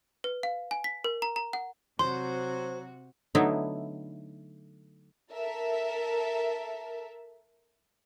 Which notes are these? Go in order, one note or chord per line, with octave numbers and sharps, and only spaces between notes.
B4
F5
G#5
B6
A#4
A#5
A#5
F#5
C3 F#3 F#4 C5 C6
D3 F#3 A3 B3 D#4 E4
A4 A#4 E5